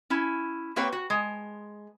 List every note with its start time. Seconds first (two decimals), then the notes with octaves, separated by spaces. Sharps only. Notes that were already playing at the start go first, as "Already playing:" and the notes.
0.10 C#4 E4
0.76 A#3 C4 G4 B4 C#5 G5
0.92 F#4
1.10 G#3